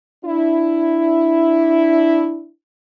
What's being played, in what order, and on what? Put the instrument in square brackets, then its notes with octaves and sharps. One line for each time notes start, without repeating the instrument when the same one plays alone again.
[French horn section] D4 E4